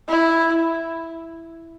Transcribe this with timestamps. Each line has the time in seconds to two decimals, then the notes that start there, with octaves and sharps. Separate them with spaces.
0.08 E4